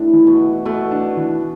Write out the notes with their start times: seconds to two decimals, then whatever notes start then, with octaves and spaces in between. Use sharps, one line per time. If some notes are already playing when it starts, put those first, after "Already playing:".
Already playing: A2 D4
0.13 E3
0.27 B2
0.40 E3
0.65 B2 A3
0.91 D4
1.17 E3